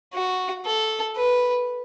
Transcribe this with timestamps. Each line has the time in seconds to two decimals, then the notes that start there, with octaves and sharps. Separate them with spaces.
0.14 F#4
0.66 A4
1.17 B4